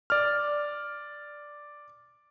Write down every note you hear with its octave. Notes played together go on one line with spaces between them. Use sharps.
D5 F6